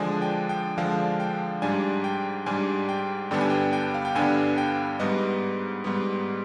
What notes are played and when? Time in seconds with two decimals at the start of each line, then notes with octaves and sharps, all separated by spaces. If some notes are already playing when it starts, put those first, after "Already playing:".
Already playing: D3 F3 G#3 D4 G#5
0.22 G5
0.49 G5
0.78 D3 F3 G#3 D4 F5
1.20 G5
1.62 G#2 G3 D4 G#5
2.04 G5
2.46 G#2 G3 D4 G#5
2.89 G5
3.31 G2 D3 G3 B3 D4 G5
3.41 G#5
3.50 G5
3.73 G5
3.94 F5
4.05 G5
4.15 G2 D3 G3 B3 D4 G#5
4.58 G5
5.00 G#2 G3 B3 D#5
5.84 G#2 G3 B3